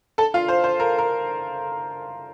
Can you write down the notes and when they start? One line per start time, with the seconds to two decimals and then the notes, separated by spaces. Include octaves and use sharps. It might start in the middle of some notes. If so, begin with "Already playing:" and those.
0.18 A4 A5
0.34 F4 F5
0.48 C5
0.64 C5
0.80 A#4
0.98 A#4